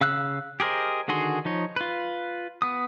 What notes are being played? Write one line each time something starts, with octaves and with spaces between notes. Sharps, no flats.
C#3 F5 E6 F#6
G4 G#4 A#4 C5 D#5
D3 D#3 F#4 G#4 C6
F3 D#4 C#5
F4 B4
B3 D#6